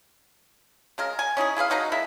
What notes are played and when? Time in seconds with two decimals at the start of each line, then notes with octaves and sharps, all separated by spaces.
0.98 C#3 G#3 A#4
1.19 G#5
1.37 C#4 D#4 E4 G#4
1.57 E4 G#4 B4 F5
1.70 F#3 D#4 B4 A#5
1.92 G#3 A#3 E4 E5